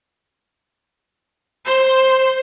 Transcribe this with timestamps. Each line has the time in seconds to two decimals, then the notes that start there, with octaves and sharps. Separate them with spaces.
1.66 C5 C6